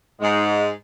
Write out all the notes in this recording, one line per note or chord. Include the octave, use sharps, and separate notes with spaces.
G#2 G#3